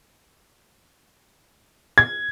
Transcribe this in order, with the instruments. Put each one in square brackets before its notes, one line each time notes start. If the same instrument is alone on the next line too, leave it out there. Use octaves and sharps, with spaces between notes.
[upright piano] G#6